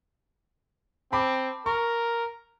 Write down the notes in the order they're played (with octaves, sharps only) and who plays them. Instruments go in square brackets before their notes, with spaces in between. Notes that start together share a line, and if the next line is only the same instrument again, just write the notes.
[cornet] C4 [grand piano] A5 B5 D6
[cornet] A#4 [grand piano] C#6